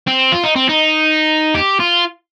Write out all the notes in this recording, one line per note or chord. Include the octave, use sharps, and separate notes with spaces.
C4
F4
D#4
C4
D#4
G4
F4